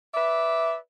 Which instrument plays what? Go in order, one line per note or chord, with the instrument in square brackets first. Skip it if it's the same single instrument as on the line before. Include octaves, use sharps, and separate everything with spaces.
[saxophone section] B4 D5 E5